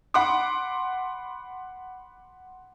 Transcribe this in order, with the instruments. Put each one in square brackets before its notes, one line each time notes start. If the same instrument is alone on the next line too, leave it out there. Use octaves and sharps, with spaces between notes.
[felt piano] F#5 B5 C6 D6